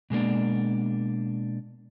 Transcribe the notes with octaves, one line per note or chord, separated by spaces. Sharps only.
B2 G#3 A#3 D4